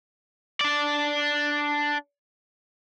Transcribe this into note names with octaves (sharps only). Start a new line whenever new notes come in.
D4 D5